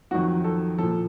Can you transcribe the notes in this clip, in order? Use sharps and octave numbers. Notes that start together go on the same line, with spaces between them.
F2 D#3 F#3 F#4
A4
A#2 F3 A4